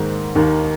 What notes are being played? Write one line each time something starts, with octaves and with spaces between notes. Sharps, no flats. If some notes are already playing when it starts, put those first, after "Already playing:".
Already playing: G#2 D#3 A#3 C5
D#2 D#3 A#3